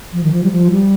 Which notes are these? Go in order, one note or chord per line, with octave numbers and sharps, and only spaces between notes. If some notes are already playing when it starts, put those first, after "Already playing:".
F3
D#3
F3
G3
F3
G3